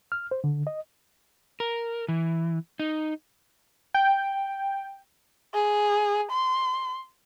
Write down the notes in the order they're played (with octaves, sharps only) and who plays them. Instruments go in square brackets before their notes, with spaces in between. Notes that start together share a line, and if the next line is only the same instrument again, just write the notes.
[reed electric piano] F6
C5
D3
D#5
[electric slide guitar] A#4
E3
D#4
[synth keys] G5
[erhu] G#4
C6